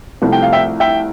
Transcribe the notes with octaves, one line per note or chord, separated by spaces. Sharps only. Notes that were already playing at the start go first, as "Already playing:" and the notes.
C2 C3 F3 A3
G5
F5
E5 G5
E5 G5